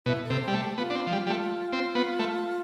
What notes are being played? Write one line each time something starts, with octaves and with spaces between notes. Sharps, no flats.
B2 E4
A4
C3
C4
G3
A3
G4
B3 F4
D4
C4
F3
G3
G3
A3
C4
B3
A3